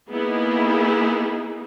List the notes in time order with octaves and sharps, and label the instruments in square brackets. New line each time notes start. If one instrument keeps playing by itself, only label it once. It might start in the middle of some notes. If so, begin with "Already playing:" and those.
[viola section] A#3 B3 D#4 E4 G#4